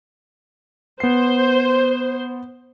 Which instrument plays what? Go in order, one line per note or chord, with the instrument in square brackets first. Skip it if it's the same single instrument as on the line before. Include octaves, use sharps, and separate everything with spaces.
[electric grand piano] B3 C7 [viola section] C5